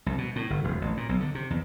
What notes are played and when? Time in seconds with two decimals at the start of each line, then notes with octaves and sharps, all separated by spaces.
0.06 C2
0.18 B2
0.36 A2
0.50 G1
0.64 E1
0.81 A1
0.97 A#2
1.09 B1
1.20 D3
1.35 C3
1.50 E2